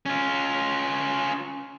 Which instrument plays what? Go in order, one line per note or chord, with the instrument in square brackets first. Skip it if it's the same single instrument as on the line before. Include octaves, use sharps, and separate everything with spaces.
[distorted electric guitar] C#4 F4